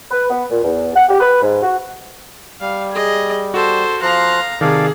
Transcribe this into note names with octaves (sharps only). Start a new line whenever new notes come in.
B4
B3
A#2
E2
F#5
G4
B4
G#2
F#4
G3 F5
G#4 D#5
F#4 A4 C5
F3 F5 A#5 C6 F#6
C3 D#3 G#4 A4 D5 F5